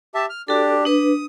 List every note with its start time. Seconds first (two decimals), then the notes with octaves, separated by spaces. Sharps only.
0.15 G4 E5 A5
0.30 F6
0.48 D4 F#4 G4 A4
0.85 D4 B4 D#6